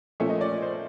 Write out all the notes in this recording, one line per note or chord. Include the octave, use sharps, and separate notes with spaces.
A#2 F3 A3 C#4 E5
D#5
D5
C5